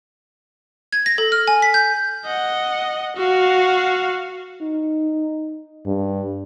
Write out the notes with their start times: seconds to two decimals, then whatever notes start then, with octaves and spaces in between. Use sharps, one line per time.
0.93 G#6
1.06 A#6
1.18 A4
1.32 F6
1.48 G#5
1.62 B6
1.74 G6
2.25 D#5 F#5
3.16 F#4 F5
4.62 D#4
5.86 G2